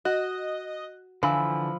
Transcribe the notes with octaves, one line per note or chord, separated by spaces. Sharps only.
F#4 D#5 F#6
D3 E3 F3 F5 G#5 B5 E6